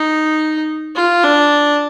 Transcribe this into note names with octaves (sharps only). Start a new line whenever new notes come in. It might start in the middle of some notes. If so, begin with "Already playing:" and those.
Already playing: D#4
F4
D4